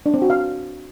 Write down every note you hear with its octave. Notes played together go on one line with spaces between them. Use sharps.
D4
C4
F#4
F5